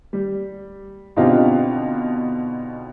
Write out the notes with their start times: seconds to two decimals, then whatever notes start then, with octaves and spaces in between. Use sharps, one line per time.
0.13 G3
1.16 B2 D3 C4 D#4 F4 G4